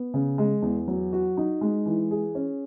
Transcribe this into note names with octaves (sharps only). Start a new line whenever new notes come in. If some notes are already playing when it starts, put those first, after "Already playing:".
Already playing: B3
C#3
G#3
E2
F#3
F#4
D#4
G#3
E3
G#4
C#4